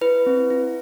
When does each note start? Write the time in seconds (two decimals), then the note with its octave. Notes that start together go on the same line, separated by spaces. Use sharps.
0.01 E4 B4
0.26 C4
0.51 E4